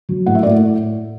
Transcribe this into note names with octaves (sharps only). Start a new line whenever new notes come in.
F#3
A2 F#5
E5
A2 D5